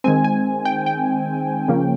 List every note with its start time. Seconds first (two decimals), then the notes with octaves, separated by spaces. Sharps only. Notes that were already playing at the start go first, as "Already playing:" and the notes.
0.04 D#3 G#3 C4 G#5
0.24 G#5
0.65 G5
0.86 G5
1.68 C#3 F3 A#3 C#4